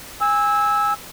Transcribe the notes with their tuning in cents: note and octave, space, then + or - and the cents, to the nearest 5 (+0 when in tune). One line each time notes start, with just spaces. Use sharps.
G#5 -20 E6 -15